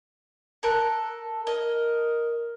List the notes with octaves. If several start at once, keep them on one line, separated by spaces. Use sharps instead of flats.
A4 A#4 F#6
A#4 D#5